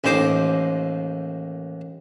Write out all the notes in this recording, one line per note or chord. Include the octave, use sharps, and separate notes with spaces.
A1 D#2 D#4 C5 D6 D#6